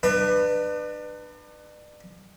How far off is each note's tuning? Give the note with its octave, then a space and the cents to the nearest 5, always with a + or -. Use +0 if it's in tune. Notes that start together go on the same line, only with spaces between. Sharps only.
D4 +35 B4 +0